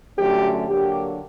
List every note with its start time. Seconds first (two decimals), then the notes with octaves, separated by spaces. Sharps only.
0.18 F#2 D3 F#3 A3 C#4 G4
0.68 D3 F#3 A#3 G4